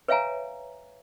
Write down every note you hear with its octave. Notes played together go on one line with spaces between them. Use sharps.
B4 C#5 E5 F5 G#5 A#5